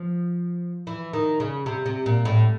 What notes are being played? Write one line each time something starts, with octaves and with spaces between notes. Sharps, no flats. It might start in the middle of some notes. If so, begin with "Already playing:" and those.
Already playing: F3
E3
D#3
C#3
C3
C3
A#2
A2